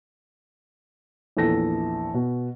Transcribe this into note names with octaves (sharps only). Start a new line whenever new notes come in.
A#1 E2 A4 A#6
B2